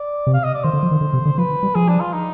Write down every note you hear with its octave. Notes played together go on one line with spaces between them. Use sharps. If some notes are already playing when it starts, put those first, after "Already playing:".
Already playing: D5
C3
F5
D#5
D5
D#3 C5
D3
F3
D#3
D3
C3
D3
F3 B4
G3
F3 G#4
D4
F4
D#4